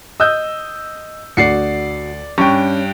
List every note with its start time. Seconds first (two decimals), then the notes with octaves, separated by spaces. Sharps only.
0.20 D#5 D#6 E6 G6
1.37 D2 F#4 D5 C7 C#7
2.38 G2 C#4 G5 C#6